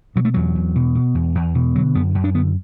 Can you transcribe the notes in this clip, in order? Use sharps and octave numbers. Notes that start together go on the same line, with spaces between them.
B2 F#3
A3
E2 F#3
E2
B2
B2
E2
E2
B2
D3 F#3
F#2 B3
F#2
D4
D3 B3